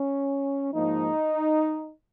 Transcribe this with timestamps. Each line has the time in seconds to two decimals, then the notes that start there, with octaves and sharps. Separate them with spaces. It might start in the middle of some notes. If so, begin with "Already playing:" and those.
Already playing: C#4
0.73 G#2 F3 A#3 D#4